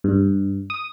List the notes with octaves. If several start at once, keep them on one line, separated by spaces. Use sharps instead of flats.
G2
D#6